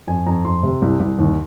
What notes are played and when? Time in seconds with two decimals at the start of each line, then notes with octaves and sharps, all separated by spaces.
0.07 F2 G#5
0.26 F2 A#5
0.45 F2 C6
0.63 C3
0.82 C2
1.00 C2
1.19 D#2